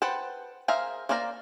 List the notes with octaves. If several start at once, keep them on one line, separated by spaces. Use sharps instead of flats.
B4 C5 F#5 G5 A5
G#4 A#4 C5 E5 F5
A#3 C5 D5 F5 A#5